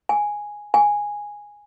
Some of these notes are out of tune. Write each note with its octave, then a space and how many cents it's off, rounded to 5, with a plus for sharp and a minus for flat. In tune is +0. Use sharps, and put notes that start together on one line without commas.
G#5 +0
G#5 -5